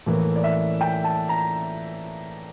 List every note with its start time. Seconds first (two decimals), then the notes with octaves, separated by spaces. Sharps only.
0.06 A2 E3 A#3
0.36 D5
0.44 E5
0.81 G5
1.04 A5
1.29 A#5